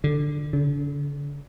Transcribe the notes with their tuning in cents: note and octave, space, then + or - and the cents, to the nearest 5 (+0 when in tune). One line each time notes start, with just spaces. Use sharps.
D3 +10
D3 -40